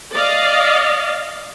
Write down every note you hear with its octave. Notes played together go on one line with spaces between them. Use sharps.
D5 D#5 F5